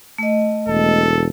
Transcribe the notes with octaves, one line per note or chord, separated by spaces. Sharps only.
A3 D#5
E1 A4